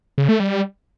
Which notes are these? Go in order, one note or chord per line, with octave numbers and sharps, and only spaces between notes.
C#3
A3
G3